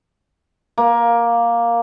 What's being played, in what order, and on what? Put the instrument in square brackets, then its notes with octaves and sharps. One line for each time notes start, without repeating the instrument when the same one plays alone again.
[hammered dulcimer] A#3